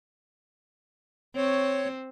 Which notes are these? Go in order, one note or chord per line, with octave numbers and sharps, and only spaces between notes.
C4 C#5